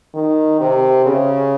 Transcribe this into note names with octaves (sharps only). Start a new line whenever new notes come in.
D#3
C3
C#3